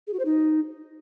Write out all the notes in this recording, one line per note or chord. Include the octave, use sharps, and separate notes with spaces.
G#4
F#4
C5
D#4